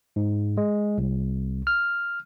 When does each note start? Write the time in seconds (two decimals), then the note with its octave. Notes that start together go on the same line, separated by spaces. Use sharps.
0.16 G#2
0.57 G#3
0.98 C2
1.67 F6